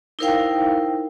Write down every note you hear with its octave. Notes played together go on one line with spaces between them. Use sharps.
D#4 E4 A#4 C5 F5 G5